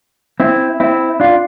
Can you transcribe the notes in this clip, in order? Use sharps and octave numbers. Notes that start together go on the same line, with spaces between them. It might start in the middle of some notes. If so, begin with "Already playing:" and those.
C4 E4
C4 E4
D4 F4